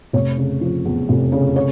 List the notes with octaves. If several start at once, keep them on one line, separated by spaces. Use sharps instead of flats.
F1 C#5
C#3
F3
E2
F1
C#3
C#5